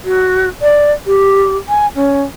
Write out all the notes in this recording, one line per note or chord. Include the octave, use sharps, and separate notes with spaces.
F#4
D5
G4
G#5
C#4